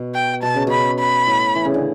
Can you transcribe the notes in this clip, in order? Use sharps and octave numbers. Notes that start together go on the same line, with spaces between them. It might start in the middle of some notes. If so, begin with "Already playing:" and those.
Already playing: B2
G5
B2 A5
C#3
B2 B5
B5
A2
E3
C#3
D3